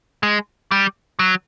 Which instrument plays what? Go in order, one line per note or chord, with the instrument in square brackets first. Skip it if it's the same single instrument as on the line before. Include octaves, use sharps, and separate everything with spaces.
[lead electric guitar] G#3
G3
F#3